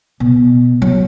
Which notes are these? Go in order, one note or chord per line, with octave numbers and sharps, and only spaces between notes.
B2
F#3